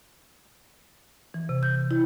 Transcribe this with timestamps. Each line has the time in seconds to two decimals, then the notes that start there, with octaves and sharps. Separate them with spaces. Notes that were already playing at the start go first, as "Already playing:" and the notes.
1.34 E3
1.49 C3
1.63 G6
1.91 E4